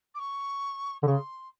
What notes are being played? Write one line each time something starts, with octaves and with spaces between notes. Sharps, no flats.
D6
C#6
D3
C#3 C#6
C6